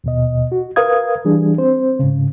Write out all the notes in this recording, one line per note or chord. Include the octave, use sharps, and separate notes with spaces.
D#2 B2 D#5
F#4
A#4 B4 F5 D#6 G#6
E3 G3 D4 G#4
C4 C5
G#2 C#3